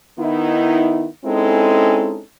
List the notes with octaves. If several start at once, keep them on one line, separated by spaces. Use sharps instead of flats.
D#3 B3 D#4 E4
G#3 C4 C#4 D#4 E4 A4